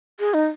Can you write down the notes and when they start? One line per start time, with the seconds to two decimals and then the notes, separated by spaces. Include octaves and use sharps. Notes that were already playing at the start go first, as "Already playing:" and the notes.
0.20 G#4
0.34 D#4